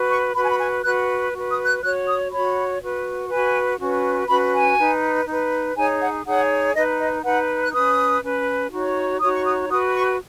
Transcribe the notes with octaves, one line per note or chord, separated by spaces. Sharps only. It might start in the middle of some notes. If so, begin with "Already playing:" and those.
Already playing: F#4 B4
C#6
F#4 B4 B5
G#5
B5
G#5
F#4 B4 F#6
F#4 B4
D#6
F#6
F#4 C#5 F#6
D#6
F#4 C#5 B5
F#4 B4
F#4 B4 G#5
C#4 F#4 B4
C#4 F#4 B4 B5
G#5
D#4 B4
D#4
B4
D#4 G#4 C#5 G#5
F#5
D#4 G#4 C#5 F#5
D#4 B4 D#5
D#5
D#4 B4 F#5
F#6
C#4 B4 D#6
C#4 B4
D#4 F#4 C#5
D#4 F#4 C#5 D#6
C#6
D#6
F#4 B4 D#6
C#6